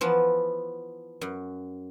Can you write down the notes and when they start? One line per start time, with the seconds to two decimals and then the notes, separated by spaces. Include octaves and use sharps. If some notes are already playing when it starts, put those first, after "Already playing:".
0.01 E3 F3 B3
1.21 F#2